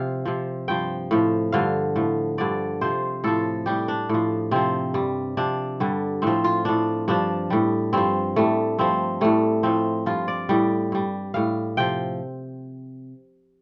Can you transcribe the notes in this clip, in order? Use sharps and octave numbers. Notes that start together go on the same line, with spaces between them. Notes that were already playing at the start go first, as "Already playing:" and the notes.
Already playing: C3 F3 F5
C3 F3
G2 F3 G5
A2 F3
G2 D3 F3 F5
A2 F3
G2 D3 F3 D5
C3 F3 C5
A2 F3 A4
A2 G3 G4
D4
A2 F3
C3 F3 C4
G2 G3
C3 F3 D4
G2 D3 G3
A2 F3 C4
F4
A2 F3 D4
G2 F3 D4
A2 G3
G2 F3 C4
A2 G3 A3
G2 F3 C4
A2 G3 A3
A2 F3 C4
G2 F3 F4
D5
A2 G3
G2 G3
A2 G3 F5
C3 F3 G5